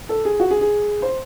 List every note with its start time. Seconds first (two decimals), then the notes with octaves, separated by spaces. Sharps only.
0.09 A4
0.25 G#4
0.40 F#4
0.51 G#4
0.61 G#4
1.02 C5